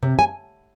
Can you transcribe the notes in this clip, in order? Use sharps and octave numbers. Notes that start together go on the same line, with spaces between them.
C3
G#5